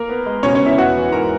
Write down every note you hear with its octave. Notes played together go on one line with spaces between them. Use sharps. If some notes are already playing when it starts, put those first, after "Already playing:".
Already playing: A#3 A#4
B3
G#3
B2 C#4 C#5
C#4 C#5
B2
E4 E5
B3 F#4 F#5
E3
G#2 A#4 A#5